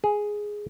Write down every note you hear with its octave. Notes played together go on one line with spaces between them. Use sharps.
G#4